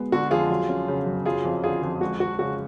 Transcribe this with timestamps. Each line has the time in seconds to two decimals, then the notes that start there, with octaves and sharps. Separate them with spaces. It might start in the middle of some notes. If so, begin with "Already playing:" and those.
Already playing: B2 G#3 B3
0.12 D3 F#4
0.31 F2 F4 G#4
0.50 F#3
0.69 C#4
0.88 C#3
1.07 F#2
1.26 F#3 F4 G#4
1.44 F2
1.64 D3 F4 G#4
1.83 F2
2.01 G#3 F#4
2.20 F2 F#4
2.39 C#3 F#4